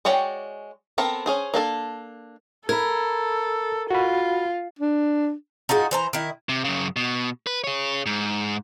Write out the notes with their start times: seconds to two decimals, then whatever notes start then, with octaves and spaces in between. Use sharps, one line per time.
0.05 G#3 F#4 C#5 D5 G5
0.98 B3 C4 A4 A#4
1.26 C#4 G#4 C5
1.54 A#3 D4 A4
2.69 A4 A#4 B5 G#6
3.91 F4 F#4 B5
4.79 D4
5.69 D#4 F4 F#4 G#4
5.91 E3 C5 A#5
6.13 D#3 E4
6.49 C3
6.64 F#2 C#3
6.96 B2
7.47 B4
7.64 G#4 C#5
8.06 G#2